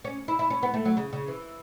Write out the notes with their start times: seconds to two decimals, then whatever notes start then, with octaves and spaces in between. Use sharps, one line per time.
0.04 C#4
0.28 E4
0.39 E4
0.50 C#4
0.63 B3
0.74 A3
0.85 F#3
0.97 C#3
1.13 C#3
1.28 E3